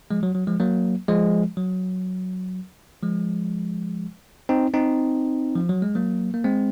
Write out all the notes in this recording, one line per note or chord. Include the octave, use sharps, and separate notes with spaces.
F3 G#3
F#3
F#3
F3 G#3
F#3 A#3
F3 G#3
F#3
F3 G#3
C4 D#4
C4 D#4
F3
F#3
G#3
F#3 A#3
A#3
G#3 C4